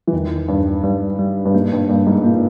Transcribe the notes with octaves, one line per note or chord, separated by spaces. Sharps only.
E3
E2 D#3
E2 G2
G2 G3
G3
G2
G#2 A#3
G2
G2 A#3
G#2
A#2 A#3